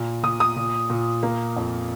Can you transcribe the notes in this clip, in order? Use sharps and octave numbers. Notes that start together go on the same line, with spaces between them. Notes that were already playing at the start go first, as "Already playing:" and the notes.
Already playing: A#2
A#2 D#6
D#6
A#2
A#2
A#3
F2